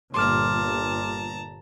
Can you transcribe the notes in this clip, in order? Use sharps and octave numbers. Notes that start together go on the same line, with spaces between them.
G1 A#2 A5 A#5 C6 D6 F6